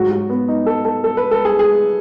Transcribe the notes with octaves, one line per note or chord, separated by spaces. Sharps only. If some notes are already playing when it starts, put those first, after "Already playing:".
Already playing: G#2 F#3 F#4
F#4
B3
D#4
A4
A4
A4
B4
A4
G#4
G#4